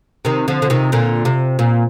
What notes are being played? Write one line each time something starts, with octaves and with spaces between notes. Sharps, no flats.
C3 D#3
D3 F3
D3
C3 D#3
A#2 D3
C3
A#2